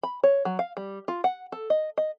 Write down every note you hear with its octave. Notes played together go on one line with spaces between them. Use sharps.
B5
C#5
F#3
F5
G3
F4
F#5
A4
D#5
D#5